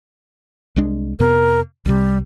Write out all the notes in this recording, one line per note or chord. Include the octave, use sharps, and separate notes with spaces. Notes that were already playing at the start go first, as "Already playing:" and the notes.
C2 G#3 D4
F2 C3 B3 A#4
C2 C3 G3